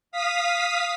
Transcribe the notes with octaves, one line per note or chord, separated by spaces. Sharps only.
F5 D#6 B6